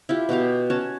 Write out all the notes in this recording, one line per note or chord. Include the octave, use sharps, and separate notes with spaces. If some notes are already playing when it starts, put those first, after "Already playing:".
E4 F4 G4
B2 F#4 G4 F5
C#4 F#4 C#5 A5